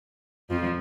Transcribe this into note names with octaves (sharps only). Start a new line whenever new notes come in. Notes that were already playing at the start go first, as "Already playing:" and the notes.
F2 F3